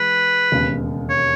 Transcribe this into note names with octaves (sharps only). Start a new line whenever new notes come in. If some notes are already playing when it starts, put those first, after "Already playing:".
Already playing: E3 G#3 B4
E1 D#2 C#3 G#3 B3
C#5